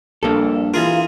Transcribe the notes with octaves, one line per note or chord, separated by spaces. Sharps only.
A#1 G2 A#3 A4
E3 F4 G#4 A#4